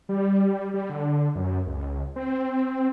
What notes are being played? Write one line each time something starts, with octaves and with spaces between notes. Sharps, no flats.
G3
G3
D3
F#2
C#2
C4